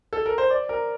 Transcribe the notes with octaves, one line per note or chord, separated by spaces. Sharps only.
A4
A#4
C5
D5
A#4